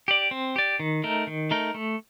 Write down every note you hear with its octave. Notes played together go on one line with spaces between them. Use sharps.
G4 D5
C4
G4 D5
D#3
A3 D#4 A#4
D#3
A3 D#4 A#4
A3